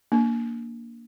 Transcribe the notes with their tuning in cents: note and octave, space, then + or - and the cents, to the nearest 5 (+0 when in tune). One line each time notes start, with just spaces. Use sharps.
A#3 +0 D4 -10